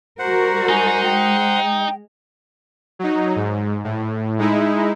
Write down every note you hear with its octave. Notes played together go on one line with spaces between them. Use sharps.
G3 F#4 A#4 C5 F#5
D#4 G#5
G#3 G5
F#3 D#4
G#2
A2
G#3 D#4 E4